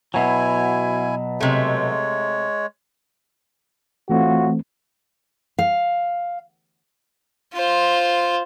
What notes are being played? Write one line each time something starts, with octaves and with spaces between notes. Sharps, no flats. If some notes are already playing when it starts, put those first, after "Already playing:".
B2 F#3 E4 G#5
C3 G#3 A3 C#5
A2 E3 A3 C4 F4 F#4
F5
F4 C5